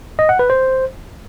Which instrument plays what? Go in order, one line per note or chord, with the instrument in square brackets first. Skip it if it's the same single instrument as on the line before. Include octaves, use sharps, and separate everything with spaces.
[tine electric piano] D#5
F#5
B4
C5